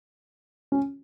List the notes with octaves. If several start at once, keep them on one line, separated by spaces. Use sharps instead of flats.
C#4